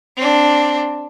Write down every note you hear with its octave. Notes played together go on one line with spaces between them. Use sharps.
C4 D4